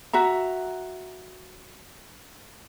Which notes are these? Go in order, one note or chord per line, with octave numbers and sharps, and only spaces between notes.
F#4 E5 A#5